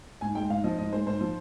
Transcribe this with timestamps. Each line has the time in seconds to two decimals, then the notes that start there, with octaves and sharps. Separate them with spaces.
0.21 G#2 G#5
0.35 G#3 G5
0.50 G#2 F5
0.64 F3 D#5
0.78 G#2 D#5
0.93 G#3 C5
1.06 G#2 C5
1.21 F3